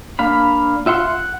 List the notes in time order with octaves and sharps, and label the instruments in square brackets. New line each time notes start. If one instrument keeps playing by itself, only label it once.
[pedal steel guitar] A#3 D4 F5 B5
F4 E5 F#5 C6
F#5